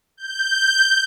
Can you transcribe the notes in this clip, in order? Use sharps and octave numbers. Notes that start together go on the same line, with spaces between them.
G6